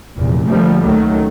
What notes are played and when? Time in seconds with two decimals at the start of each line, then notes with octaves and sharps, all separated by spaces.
0.15 F1 E2 A#2
0.47 D3 F3 G3 A3 A#3
0.81 C#2 D#3 F#3 A3